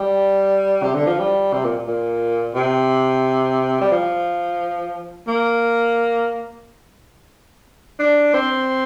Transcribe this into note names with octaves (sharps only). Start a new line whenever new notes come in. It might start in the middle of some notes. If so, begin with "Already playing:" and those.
Already playing: G3
C3
D3
F3
G3
C3
A#2
A#2
C3
G3
F3
A#3
D4
C4